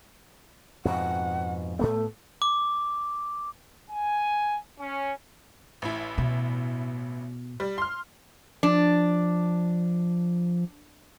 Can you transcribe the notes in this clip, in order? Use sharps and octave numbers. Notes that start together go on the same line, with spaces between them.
F2 G#2 B2 F#5
A2 A3 B3 A4
D6
G#5
C#4
A1 E4
B2
G3
C6 F6
F3 D4